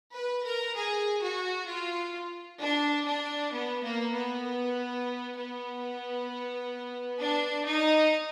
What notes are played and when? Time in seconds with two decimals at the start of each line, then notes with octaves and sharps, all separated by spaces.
0.15 B4
0.45 A#4
0.76 G#4
1.22 F#4
1.68 F4
2.60 D4
3.06 D4
3.52 B3
3.83 A#3
4.14 B3
5.36 B3
7.20 D4
7.66 D#4